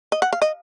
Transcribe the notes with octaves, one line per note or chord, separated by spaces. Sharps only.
D#5
F#5
F5
D#5